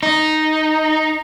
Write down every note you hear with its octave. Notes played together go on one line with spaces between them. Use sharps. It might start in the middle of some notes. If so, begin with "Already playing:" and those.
D#4